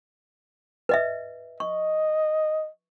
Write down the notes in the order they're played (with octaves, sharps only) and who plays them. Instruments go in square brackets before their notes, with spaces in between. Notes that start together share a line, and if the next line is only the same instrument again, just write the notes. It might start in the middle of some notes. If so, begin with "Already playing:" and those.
[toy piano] B4 D#5 E5
[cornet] D#5 [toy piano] C#6